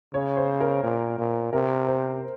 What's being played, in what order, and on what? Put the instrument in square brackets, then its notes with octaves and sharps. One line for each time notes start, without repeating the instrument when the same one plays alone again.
[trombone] C#3 [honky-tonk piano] C#5
[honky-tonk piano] C5
A#4
[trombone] A#2
A#2
[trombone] C3 [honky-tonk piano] A#4
[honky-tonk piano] C5